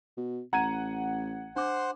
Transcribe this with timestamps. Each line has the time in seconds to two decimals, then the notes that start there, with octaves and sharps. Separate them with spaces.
0.17 B2
0.53 A1 F#5 A#5 G#6 D#7
1.56 D4 C5 F#5 C6 D6